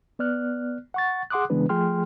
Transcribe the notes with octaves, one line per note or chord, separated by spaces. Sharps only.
B3 D5 F6 F#6
F#5 C#6 A6
G#4 F#5 C6 D6 D#6 F#6
C#3 E3 G#3 B3 D4 B4
F3 A3 G#4 G5 C6 F6